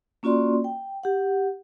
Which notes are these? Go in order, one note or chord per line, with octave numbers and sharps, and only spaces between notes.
A#3 C#4 F4 F#4 D5 C6
G5
G4 F#5